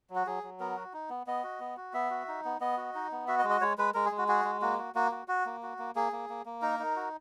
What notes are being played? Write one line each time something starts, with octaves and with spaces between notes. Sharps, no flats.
F#3
F#4
F#3 G#4
F#3
B3 A#4
F#4
D#4
B3
B3 D#5
F#4
B3
F#4
B3 E5
F#4
D#4
B3
B3 D#5
F#4
D#4
B3
F#4 E5
D#5
G#3
D#5
G#3 C#5
G#3 B4
G#3 A#4
G#4
G#3
F#4
F#4 G#4
G#3
A#3 F#4
F#4
A#3 F#4
F#4
F#4
A#3
F#4
A#3
A#3 G#4
A#3
A#3
A#3
D#4 A#4
D#4
F#4